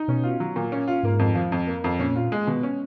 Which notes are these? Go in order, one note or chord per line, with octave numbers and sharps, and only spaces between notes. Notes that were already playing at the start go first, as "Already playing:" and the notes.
Already playing: D#4
B2 C#4
F4
F#3
A#2
C#4
F4
G#2 A#3
F2
F3
F2
A#3
F2
A#2 C#4
F4
G#3
B2
C#4